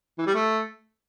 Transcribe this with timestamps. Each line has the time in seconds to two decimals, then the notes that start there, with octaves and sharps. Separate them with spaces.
0.18 E3
0.26 G3
0.34 A3